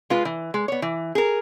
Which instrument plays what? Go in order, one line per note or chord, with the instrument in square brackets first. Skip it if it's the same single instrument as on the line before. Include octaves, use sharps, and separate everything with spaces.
[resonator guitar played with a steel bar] G#3 F4 B4
E3
G#3
B3 C#5
E3
G#4 A#4